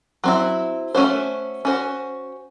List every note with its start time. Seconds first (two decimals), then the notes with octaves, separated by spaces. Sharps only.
0.24 F#3 C4 E4
0.95 A3 C#4 F#4 C5
1.65 C#4 F#4 C5